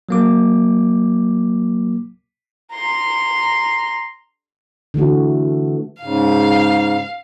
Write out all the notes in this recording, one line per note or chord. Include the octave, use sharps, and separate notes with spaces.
F#3 A#3 D6
A#5 C6
D3 E3 A3 F#4
G#2 C#3 F5